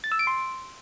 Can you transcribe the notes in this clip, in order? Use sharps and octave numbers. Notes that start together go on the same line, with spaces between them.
A6
E6
D7
C6